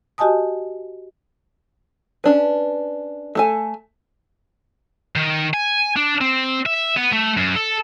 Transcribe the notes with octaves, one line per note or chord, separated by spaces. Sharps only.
F#4 G4 D#5 G#5 A5 D#6
C#4 D4 B4
A3 A4 G#5
D#3
G#5
D4
C4
E5
B3
A3
F#2
A4